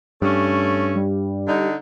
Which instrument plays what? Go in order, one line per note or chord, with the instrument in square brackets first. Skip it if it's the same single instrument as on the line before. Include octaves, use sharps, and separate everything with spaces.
[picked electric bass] G2 [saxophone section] A3 C#4
[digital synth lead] G3
[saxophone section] D3 D#4